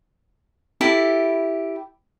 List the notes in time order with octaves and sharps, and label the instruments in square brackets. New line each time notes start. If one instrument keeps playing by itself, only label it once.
[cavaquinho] E4 G4 A4 B5